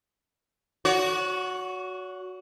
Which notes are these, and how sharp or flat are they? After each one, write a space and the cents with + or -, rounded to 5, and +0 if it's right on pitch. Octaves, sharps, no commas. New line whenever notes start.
F#4 -5 C#5 +40